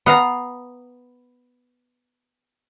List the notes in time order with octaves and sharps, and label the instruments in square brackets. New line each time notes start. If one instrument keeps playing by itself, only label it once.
[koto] B3 F5 A#5